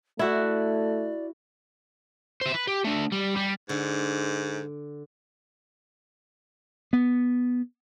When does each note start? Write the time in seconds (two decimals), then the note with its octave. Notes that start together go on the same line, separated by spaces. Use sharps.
0.19 A3 E4 F#4 D5
2.41 C5 E5
2.54 B4
2.68 G4
2.85 A3 D4
3.12 G3
3.36 G3
3.69 G#2 D3
6.93 B3